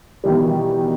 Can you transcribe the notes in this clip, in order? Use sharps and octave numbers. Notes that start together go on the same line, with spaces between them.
B2 D#3 E3 G3